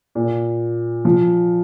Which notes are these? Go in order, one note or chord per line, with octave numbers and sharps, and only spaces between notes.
A#2
F3